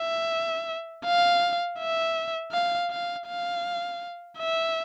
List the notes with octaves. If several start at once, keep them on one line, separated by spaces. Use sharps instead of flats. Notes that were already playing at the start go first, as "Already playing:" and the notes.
Already playing: E5
F5
E5
F5
F5
F5
E5